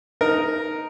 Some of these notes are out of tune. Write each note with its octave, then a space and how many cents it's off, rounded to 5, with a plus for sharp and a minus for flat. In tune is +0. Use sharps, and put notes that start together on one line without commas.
D#4 +0 A#4 +0